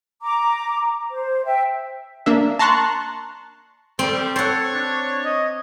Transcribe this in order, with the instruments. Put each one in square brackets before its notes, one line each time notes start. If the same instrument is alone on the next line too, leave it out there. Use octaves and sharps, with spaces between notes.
[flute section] A#5 D6
C5
E5 G5
[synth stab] A#3 D4 E5
A5 A#5 C6 C#6 F#6
[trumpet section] G3 [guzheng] C4
[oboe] A4 [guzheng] C5 F#5 [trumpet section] C#5
[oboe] D4
D#5